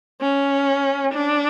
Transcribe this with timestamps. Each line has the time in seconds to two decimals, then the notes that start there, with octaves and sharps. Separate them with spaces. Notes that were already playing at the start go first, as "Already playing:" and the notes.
0.21 C#4
1.14 D4